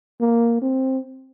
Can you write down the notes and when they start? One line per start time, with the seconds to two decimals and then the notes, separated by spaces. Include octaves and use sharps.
0.21 A#3
0.62 C4